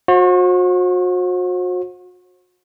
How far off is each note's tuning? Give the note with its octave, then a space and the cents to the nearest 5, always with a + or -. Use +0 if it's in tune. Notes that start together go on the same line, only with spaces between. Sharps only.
F#4 -35 C5 +35